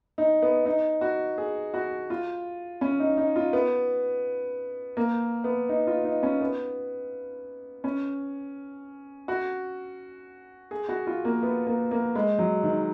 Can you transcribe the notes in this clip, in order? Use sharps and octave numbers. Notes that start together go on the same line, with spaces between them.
D#4
B3
D#4
F#4
G#4
F#4
F4
C#4
D#4
D#4
F4
B3
A#3
B3
D#4
F4
D#4
C#4
B3
C#4
F#4
G#4
F#4
F4
A#3
B3
A#3
A#3
G#3
F#3
D#3